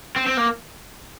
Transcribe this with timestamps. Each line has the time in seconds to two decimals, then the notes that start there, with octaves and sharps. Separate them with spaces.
0.16 C4
0.26 C4
0.37 A#3